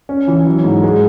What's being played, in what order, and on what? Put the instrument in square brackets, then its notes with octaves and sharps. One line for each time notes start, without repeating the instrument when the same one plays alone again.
[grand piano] C#4
E3
F#3
G#2
G#3